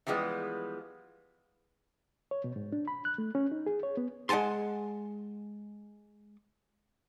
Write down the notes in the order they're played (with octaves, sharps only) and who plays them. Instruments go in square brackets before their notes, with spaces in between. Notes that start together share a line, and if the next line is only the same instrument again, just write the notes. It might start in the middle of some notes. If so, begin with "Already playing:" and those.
[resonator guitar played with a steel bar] E3 F3 G3 G#3 B3
[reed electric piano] C#5
B2
G#2
D4
B5
F#6
A3
C#4
D#4
G#4
C#5
B3
[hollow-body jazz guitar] G#3 F#5 G#5 A5 C6